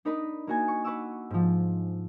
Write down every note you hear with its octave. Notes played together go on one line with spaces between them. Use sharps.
D4 D#4 A#4 B4 D#5 B5
A#3 F#4 G#5
C#6
B4 F#5 C#6 D6 E6
G#2 F3